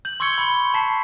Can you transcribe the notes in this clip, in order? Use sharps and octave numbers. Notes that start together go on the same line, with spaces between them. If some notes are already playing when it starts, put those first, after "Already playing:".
G6 F#7
C6 C#6 E6 G#6 C#7 G7
B5 C#7 G7
A5 B6 C7